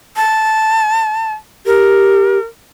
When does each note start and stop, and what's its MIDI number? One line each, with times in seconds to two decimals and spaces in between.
0.17 1.33 81
1.66 2.38 67
1.66 2.43 70